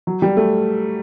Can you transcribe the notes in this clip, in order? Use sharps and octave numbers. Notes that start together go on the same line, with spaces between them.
F#3
G3
A3